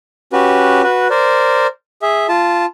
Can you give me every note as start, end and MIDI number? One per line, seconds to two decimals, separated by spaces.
0.33 0.82 61
0.33 0.82 66
0.33 0.82 67
0.33 0.82 71
0.83 1.08 66
0.83 1.08 71
1.10 1.67 70
1.10 1.67 72
1.10 1.67 74
2.02 2.27 68
2.02 2.27 76
2.29 2.65 65
2.29 2.65 81